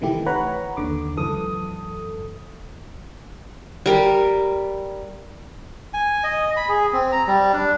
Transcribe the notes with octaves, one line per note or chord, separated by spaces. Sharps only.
C3 D#3 E3 A3 E4 G4
B4 C#5 F#5 A#5 B5
D#2 D3 D6
C#2 F#2 E3 A4 D#6
G3 A#4
G#5
D#5
B5
G#4
C4
A#5
G3
D4